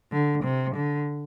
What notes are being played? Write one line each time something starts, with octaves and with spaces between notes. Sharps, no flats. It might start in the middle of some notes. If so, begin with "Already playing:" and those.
D3
C3
D3